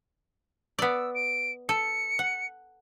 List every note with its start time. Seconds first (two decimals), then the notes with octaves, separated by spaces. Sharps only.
0.79 B3 D5 E6
1.15 D7
1.69 A4 C#7
2.19 F#5